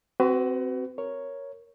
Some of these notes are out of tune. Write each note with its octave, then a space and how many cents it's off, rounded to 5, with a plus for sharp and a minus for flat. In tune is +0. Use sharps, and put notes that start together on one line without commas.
C4 -5 F#4 +25 B4 +30
A#4 +0 C#5 +0